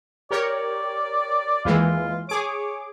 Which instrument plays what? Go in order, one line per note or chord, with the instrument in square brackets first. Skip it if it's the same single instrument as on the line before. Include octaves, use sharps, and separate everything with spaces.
[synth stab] G4 A#4 C#5 [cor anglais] D5
[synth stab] D#2 E3 G#3 [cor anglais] F4
[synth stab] G#4 D6 [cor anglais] C#5